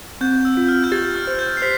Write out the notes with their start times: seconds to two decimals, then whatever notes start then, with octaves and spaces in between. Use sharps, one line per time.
0.21 C4 G6
0.45 E6
0.57 F4
0.68 F6
0.84 G6
0.92 G4 A6
1.15 F6
1.27 C5
1.39 G6
1.57 C7
1.62 C5 B6